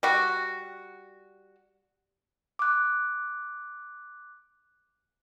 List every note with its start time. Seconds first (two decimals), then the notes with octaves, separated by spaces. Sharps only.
0.03 G3 F#4
2.59 D6 F#6